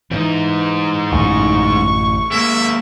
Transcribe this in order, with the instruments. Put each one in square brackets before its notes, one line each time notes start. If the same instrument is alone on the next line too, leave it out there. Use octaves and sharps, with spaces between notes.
[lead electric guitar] G#2 D#4 [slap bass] E3
[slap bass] A1 F#2 D3 [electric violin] C#6
[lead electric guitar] G#3 A#3 [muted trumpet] E5